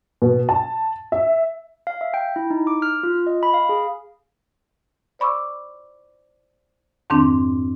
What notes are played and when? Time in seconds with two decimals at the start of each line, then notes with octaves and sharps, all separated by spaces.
0.22 B2
0.49 A5
1.12 E5
1.87 F5
2.01 E5
2.14 G5
2.36 E4
2.50 D#4
2.67 D6
2.82 F6
3.03 F4
3.27 D#5
3.43 B5
3.54 F5
3.69 G#4
5.19 C5 D5 B5 C#6 D6 E6
7.10 F2 G#2 D#3 C4 D4